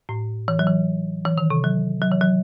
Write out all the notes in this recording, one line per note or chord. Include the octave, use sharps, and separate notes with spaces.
A2
E3
F#3
E3
E3
D#3
C3
F#3
F#3
E3
F#3